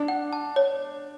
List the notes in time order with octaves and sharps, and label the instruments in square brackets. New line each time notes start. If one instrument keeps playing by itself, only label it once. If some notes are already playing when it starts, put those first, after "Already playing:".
Already playing: [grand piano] D4
[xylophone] F#5
A5
C#5